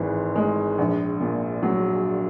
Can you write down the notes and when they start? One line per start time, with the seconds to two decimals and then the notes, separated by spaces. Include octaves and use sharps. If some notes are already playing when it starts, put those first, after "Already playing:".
Already playing: G#1 G#2 E3
0.36 G#3
0.78 A#1
1.21 A#2
1.63 F#3